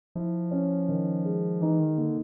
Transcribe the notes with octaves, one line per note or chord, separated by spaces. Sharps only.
F3 E4
C#4
D#3
G#3
E3 D#4
D#3
D3 A#3